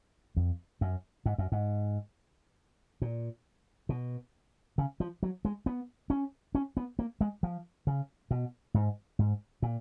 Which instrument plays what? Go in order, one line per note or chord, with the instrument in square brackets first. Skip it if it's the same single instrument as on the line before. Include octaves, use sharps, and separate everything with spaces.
[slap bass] F2
F#2
G#2
F#2
G#2
A#2
B2
C#3
F3
F#3
G#3
B3
C#4
C#4
B3
A#3
G#3
F3
C#3
B2
G#2
G#2
A#2